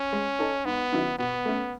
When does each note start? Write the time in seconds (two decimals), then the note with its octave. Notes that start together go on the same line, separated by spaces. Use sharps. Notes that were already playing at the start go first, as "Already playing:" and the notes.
Already playing: C#4
0.13 G#3
0.39 D#4 A4 C#5
0.65 G#2 B3
0.92 D#3 F#3 C#4 E4
1.19 B2 B3
1.45 A3 C#4